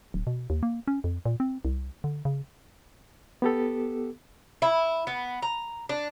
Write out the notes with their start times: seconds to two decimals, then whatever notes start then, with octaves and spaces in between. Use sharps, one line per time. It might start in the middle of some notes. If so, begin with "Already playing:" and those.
0.14 D1
0.27 B2
0.50 D#2
0.63 A#3
0.88 C#4
1.04 F2
1.25 A#2
1.40 C4
1.65 C2
2.04 D3
2.25 C#3
3.42 B3 G4 A4
4.62 E4
5.07 B3
5.42 A#5
5.89 D4